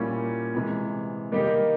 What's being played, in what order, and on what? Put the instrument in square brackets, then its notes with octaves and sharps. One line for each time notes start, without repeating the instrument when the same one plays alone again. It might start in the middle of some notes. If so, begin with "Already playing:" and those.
Already playing: [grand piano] A#2 G3 A#3 C#4 E4
C3 E3 G#3
D#3 G3 A#3 D#4 G4